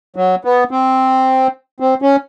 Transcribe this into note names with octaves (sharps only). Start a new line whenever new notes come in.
F#3
B3
C4
C4
C#4